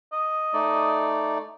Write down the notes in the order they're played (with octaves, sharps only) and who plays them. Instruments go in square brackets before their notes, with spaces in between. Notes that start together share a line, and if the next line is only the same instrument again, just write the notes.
[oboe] D#5
[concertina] A3 D#4 D5